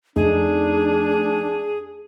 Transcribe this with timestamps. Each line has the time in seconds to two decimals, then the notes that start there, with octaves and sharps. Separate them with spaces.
0.16 F2 A3 D4 D#4 G#4